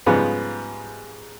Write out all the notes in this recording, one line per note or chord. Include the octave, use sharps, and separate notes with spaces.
G#2 C#3 F3 G3 B3